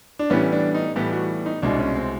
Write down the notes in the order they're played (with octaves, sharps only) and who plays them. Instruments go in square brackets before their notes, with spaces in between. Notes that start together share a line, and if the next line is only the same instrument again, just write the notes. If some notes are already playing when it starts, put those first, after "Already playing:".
[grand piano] D4
A2 E3 G3 B3 C#4
D4
D#4
A2 E3 G3 B3 G4
F#4
D#4
C2 B2 G#3 D4
C#4
C4